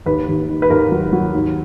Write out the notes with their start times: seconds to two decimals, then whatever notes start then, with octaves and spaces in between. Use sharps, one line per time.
0.06 D#2 B4
0.28 D#2
0.49 D#3
0.62 B4
0.70 D#2 A#4
0.92 F#3
1.13 F#3
1.33 D#2